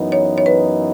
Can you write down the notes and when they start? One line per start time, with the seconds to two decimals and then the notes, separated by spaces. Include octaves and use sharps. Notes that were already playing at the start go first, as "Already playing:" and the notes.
Already playing: F#2 E3 B3 D#4
0.12 C#5
0.38 C#5
0.46 B4